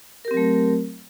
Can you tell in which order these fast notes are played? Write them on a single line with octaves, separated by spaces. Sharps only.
A#4 G4 C4 F#3 A3